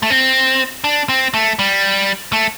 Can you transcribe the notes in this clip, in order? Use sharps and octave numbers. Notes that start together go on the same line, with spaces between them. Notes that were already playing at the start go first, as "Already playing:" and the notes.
A3
C4
D4
C4
A3
G3
A3